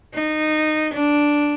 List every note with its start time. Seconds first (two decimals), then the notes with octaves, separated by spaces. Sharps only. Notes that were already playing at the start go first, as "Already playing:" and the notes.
0.15 D#4
0.94 D4